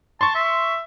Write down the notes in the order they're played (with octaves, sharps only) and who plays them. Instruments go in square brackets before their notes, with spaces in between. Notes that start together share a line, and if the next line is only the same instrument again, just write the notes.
[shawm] A5 [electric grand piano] C6 C#6
[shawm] E5